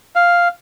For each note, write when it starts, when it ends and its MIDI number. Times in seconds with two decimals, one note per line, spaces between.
0.16 0.48 77